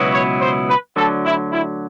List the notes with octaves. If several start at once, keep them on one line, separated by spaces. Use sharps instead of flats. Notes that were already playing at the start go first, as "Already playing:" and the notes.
Already playing: C#2 B2 F#3 B3 E4
C#5
C5
B4
D2 D3 F#3 A4
E4
E4